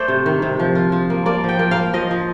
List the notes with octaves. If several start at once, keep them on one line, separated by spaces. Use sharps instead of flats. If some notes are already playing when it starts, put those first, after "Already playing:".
Already playing: A3 C5 D5
C3
D#3
C3
F3
F4
F3
A#3
A#3 D5
F3 G5
A#3
F5
A#3
F3 D#5
F3